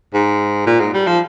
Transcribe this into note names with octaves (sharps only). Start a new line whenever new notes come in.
G#2
A#2
G#2
G3
F3